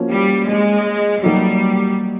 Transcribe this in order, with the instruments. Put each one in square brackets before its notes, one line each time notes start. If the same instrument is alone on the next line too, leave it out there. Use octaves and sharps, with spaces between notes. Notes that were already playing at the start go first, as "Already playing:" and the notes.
Already playing: [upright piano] F3 A#3 C#4 F#4
[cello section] G3
G#3
[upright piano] F#3 A#3 D#4 F#4 [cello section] G3